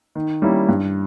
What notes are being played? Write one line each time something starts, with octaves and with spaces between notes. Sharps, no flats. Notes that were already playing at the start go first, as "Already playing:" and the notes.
D#3
G3 A#3 C#4 E4
G2